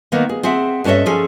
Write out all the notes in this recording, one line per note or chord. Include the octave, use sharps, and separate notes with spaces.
D#3 A#3 B3
G#4
C4 G#4 E5 F#5
G2 C#4 A4 C#5 D#5 E5
F3 C#4 G#4 A4